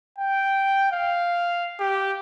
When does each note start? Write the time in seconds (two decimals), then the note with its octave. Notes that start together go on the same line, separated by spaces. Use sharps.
0.18 G5
0.92 F5
1.80 G4